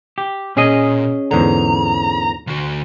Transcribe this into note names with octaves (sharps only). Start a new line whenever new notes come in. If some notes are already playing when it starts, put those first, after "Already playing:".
G4
A#2 C#4 G#4 D#5
E2 G#2 D3 A#5
D2 F#4